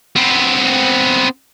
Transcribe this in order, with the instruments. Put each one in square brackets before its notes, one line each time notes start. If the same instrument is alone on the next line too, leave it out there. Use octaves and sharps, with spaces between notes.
[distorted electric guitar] B3 C4